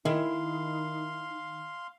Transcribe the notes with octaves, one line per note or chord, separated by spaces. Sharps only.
D#3 D#4 E4 G#4 F5 C6